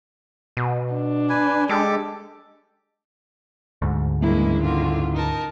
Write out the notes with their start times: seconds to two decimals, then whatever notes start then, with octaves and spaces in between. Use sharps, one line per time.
0.57 B2
0.95 D4
1.29 B4 G#5
1.69 G#3 G4 A4 D6
3.82 D2 G#2
4.21 F#1 G2 E3 G#3 A#3 E4
4.63 D3 D#3 F4
5.14 D#4 A#4 A5